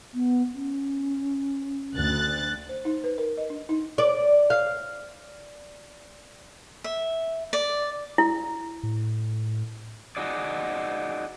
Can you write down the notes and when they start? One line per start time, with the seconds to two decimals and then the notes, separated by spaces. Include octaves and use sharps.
0.14 B3
0.53 C#4
1.94 D2 F#6 A6
2.69 C5
2.85 D#4
3.04 B4
3.18 A#4
3.37 D#5
3.50 D4
3.69 D#4
3.98 D5
4.50 F5
6.84 E5
7.53 D5
8.18 E4
8.83 A2
10.17 D#4 F#4 G#4 D5